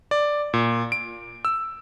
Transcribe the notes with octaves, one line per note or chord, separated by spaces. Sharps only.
D5
A#2
D7
E6